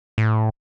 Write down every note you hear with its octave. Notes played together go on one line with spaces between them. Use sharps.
A2